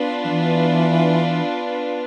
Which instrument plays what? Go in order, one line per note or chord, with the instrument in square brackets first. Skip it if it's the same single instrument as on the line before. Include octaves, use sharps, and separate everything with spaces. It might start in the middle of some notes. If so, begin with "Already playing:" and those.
Already playing: [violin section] B3 D4 F4 B4
[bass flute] F3
E3